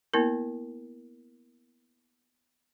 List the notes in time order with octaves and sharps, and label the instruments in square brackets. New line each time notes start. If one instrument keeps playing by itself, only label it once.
[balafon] A#3 B3 E4 A#4